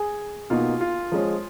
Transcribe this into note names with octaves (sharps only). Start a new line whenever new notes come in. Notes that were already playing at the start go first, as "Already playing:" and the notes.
Already playing: G#4
B2 A#3 D#4 F4 F#4
F4
F3 G#3 C#4